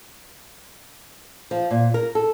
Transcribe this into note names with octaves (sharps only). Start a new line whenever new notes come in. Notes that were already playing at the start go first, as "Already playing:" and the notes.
F3
A#2
A#4
A4